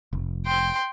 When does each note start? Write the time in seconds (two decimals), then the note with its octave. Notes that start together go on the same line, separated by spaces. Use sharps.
0.13 F1
0.46 G5 C6